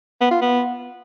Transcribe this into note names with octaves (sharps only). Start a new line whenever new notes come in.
B3
F4
B3